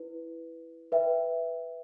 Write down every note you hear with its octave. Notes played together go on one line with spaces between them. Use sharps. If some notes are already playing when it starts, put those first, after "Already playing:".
Already playing: E4 B4
B4 E5 G5